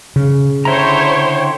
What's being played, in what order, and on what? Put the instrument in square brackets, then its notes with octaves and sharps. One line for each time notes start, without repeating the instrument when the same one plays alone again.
[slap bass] C#3
[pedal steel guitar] D3 E4 A#5 [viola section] C5 C#5 G5